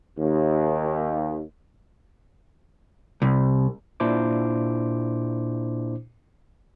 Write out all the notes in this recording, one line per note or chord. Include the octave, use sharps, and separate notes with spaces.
D#2
C2
A#2 D4 E4 C5 D6